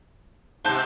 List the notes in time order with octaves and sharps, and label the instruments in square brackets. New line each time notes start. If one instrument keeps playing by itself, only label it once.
[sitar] G#2 C3 [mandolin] C5 A5 G6